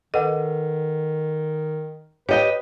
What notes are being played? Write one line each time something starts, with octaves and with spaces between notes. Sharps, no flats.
D#3 A4 B4 D#5 F#5
G4 B4 C#5 D#5 G5